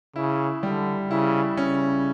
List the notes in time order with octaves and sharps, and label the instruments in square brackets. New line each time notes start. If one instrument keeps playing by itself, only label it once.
[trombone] C#3 [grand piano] E4
[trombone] D3 [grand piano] G3
[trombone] C#3 [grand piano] E4
[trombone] C#3 [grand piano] C#4